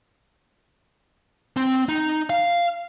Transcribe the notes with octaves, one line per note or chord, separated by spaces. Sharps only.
C4
D#4
F5